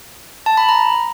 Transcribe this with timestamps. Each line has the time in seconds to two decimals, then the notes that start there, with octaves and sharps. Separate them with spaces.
0.46 A5
0.57 B5
0.69 A#5